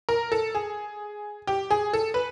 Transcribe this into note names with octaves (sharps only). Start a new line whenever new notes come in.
A#4
A4
G#4
G4
G#4
A4
B4